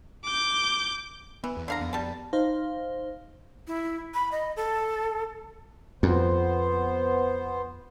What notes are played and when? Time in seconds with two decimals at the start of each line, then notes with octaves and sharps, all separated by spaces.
0.24 D6 G6
1.44 E3 B3
1.57 E2
1.68 D3 F5 A#5
1.81 F2 B3
1.93 G3 A5
2.33 D#4 C5 F5
3.67 E4
4.14 B5
4.32 D#5
4.56 A4
6.03 F2 B3 C5